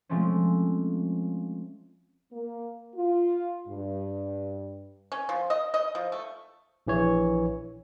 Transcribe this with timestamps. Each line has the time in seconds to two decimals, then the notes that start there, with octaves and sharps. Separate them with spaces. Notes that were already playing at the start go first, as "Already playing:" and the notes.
0.09 F3 G#3 A3 C4 C#4
2.33 A#3
2.95 F4
3.68 G2
5.12 C#4
5.29 F3
5.50 D#5
5.74 D#5
5.95 F3
6.12 A3
6.87 A#1 E3 C#5